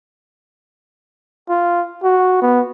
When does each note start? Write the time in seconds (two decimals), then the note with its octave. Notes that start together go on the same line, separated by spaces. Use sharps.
1.49 F4
2.03 F#4
2.42 B3